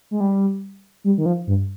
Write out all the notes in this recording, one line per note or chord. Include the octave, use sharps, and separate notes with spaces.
G#3
G3
G3
D#3
F3
G2